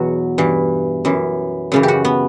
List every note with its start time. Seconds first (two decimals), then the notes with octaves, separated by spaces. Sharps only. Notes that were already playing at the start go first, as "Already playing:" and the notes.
Already playing: E2 B2 F#3 F#4
0.38 G2 E3
1.05 F#2 E3
1.72 F#2 C#3 E3
1.83 G4
1.88 F#4
2.05 B3